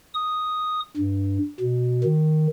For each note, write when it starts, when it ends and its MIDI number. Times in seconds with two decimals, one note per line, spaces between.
0.14 0.80 87
0.97 1.38 43
1.60 2.04 47
2.04 2.47 51